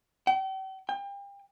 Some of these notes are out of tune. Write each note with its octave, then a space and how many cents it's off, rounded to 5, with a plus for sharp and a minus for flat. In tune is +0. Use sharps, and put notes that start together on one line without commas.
G5 -40
G5 +35